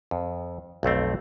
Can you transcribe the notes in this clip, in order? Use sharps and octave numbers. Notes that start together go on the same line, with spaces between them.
F2
B1 F2 A3 C4